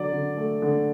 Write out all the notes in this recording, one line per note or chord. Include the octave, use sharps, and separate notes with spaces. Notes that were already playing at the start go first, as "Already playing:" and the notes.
Already playing: D3 F#3 D5
D3
A3
D3